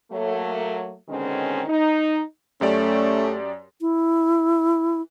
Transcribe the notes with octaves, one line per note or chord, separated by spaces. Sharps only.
F#3 A3 A#3
B2 D3 D#3 G#3 C4 C#4
D#4
F#2 A3 C#4 G4 D5
E4